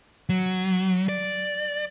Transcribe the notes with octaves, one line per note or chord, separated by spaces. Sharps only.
F#3
D5